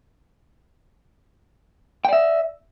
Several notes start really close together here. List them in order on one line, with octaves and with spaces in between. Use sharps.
G5 D5 E5